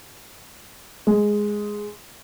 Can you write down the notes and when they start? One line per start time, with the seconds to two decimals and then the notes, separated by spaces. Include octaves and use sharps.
1.07 G#3